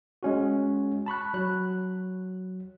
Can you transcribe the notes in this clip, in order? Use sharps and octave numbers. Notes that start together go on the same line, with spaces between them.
G#3 C#4 F#4
A5 B5 C#6 F#6
F#3 F#6